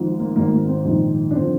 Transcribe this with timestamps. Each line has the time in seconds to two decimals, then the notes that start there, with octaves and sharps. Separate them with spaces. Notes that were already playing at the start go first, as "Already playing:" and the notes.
Already playing: G#1 G#2 F3
0.19 A#3
0.35 G#1 G#2 D#3 A#3
0.52 A#3
0.68 C4
0.85 A#1 G#2 D#3
1.31 D4
1.35 D3 F3 C4